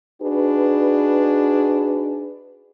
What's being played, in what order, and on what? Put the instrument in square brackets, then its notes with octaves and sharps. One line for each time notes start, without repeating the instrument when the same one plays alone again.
[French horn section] D4 D#4 F#4 G#4 B4